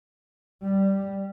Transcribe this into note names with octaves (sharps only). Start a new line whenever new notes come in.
G3